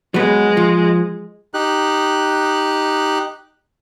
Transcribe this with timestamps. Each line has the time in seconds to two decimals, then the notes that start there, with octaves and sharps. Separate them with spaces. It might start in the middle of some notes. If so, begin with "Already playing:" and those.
0.14 F#3 G#3 B3
0.57 F3
1.54 D#4 G4 F#6